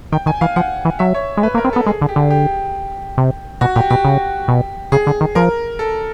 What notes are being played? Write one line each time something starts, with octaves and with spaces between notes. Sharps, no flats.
D#3 G5
D#3 G#5
E3 F5
F3 F#5
E3
F#3 E5
C#5
G#3
A3 B4
A#3
A#4
C4
B3 A4
G#3 G#4
D3
G4
D3
G4
C3
B2 F#4
A#2 G4
B2 G4
C#3
B2
C#3 G#4
D3
D#3
F3 A#4
A4